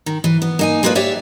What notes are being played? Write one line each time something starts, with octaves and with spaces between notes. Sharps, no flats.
D#3
E3
B3
A#3 D#4 G#5
G3 G#3 A#3 F4 B4 D5
G4 C#5 D5 E5